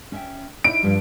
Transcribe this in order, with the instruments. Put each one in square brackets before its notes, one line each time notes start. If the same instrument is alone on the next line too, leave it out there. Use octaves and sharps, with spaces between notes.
[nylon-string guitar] C#4 E5 G5
[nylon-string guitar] D#4 E4 [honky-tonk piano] D7
[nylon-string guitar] G2 F3 G3